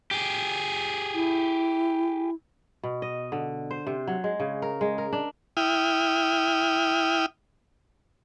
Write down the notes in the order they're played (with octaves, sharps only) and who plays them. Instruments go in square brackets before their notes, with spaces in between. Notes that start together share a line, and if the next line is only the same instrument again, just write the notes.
[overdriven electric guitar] G4 G#4
[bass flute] E4
[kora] B2
D#5
D3
C5
C3
F#3
G#3
C#3
A#4
G#3
A#4
D4
[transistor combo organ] E4 G5 D#6 F6